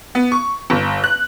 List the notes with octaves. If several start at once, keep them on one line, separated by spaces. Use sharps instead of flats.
B3
C#6
G1
F#6